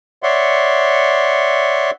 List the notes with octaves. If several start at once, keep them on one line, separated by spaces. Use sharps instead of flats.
C#5 D5 E5 F#5 C6